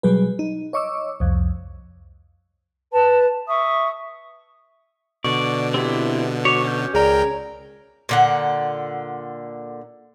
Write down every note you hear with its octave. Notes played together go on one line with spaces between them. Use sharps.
B2 F#3 G3 G#4 B4
D#4
C#5 D#5 C#6 D6 E6
C2 F2
B4 A5
E5 C#6 D#6
B2 D3 D5 C#6
C4 E4 G4
F#4 C#5 D6
C#4 G6
C#2 G#4 A#4 C#5 D5 G5 A#5
A#2 D3 F#5